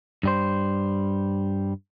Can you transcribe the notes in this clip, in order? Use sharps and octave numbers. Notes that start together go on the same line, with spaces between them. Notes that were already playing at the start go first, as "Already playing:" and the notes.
G2 G3 C5